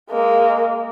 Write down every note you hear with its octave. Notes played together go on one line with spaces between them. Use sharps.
G#3 A#3